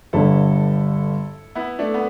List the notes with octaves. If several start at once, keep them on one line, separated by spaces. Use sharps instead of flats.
G1 G2 D3 E4 A4
B3 E4
A3 D4
B3